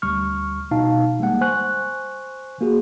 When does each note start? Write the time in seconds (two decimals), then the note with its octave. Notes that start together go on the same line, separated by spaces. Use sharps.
0.02 D2 G3 C#6 F6
0.71 G1 B2 D#4 F5 A5
1.19 G#1 G3 G#3 A#3 F#5
1.41 C5 G#5 C#6 F#6
2.61 A#3 F#4 G#4